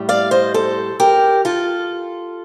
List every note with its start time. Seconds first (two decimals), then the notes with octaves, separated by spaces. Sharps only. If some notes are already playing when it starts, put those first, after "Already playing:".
Already playing: A2 G3
0.09 D5 F5
0.31 C5 D#5
0.54 A4 C5
1.00 G4 A#4
1.45 F4 A4